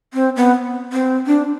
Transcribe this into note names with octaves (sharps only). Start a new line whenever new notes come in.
C4
B3
C4
D4